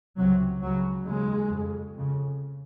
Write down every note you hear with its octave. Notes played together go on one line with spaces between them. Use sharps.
C#2 C3 F#3
C#2 C#3 F#3
D#2 C#3 G#3
F2 C#3
F2 C#3